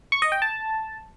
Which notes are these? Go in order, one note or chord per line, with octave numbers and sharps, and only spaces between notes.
C#6
D#5
G5
A5